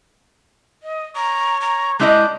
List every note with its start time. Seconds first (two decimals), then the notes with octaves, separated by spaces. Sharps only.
0.83 D#5
1.16 C#5 A#5
1.61 A#5
2.00 G#3 D4 E4 D#5 G6